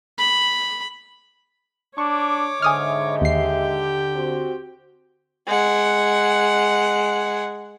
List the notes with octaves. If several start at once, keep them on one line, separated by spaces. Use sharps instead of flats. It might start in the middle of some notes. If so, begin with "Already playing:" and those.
B5
D4 C#5 C#6 D6
G#2 D3 D#5 E5 G#5 D#6 F6
D#2 G4 G5 C7
C4 F#4 C5
G#3 F#5